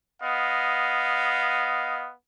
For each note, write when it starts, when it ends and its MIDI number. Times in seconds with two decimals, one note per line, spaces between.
0.23 2.13 59
0.23 2.13 75
0.23 2.13 77